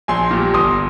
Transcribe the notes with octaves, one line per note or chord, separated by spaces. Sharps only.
A#1 G#5 C6
A#2 G3
G1 C6 D#6